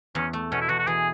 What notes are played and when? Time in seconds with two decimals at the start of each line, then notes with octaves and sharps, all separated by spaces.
0.15 E2 C#4
0.33 A3
0.52 B2 C#4
0.61 E4
0.69 E2 F#4
0.79 F#4
0.87 E3 G#4